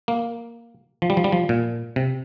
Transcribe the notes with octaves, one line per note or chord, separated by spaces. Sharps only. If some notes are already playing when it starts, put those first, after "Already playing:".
A#3
F3
G3
F3
G3
F3
A#2
C3